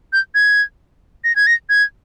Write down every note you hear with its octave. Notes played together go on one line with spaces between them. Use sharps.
G6
G#6
A#6
G#6
A#6
G#6